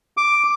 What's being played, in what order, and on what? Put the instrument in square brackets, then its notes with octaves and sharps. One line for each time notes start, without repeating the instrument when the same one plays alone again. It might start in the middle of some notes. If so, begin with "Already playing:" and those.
[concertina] D6